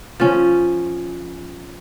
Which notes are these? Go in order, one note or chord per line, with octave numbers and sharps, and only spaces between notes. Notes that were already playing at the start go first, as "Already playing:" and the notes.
F3 C#4